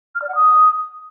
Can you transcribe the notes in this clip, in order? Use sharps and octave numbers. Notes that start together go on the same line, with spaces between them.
F6
D5
F#5
D#6